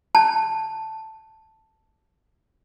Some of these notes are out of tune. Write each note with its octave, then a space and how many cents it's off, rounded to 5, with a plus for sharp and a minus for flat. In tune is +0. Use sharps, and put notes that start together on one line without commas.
A5 +5